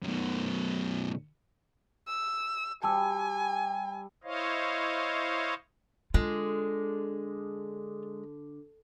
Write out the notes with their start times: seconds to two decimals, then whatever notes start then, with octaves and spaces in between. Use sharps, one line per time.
0.02 F#2 B2
2.08 E6
2.83 G3 G#5 A5 E6
4.24 E4 C5 C#5 D#5 F5
6.14 D3 G#3 F4